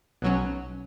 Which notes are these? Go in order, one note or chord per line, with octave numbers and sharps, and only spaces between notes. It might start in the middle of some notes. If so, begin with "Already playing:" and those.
B1 B2 F#3 C#4